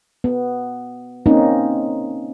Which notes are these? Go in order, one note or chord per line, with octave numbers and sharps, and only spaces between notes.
B3
A#3 C4 C#4 D#4